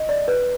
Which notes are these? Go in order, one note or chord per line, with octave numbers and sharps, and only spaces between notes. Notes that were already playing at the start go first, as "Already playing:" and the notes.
Already playing: D#5
D5
B4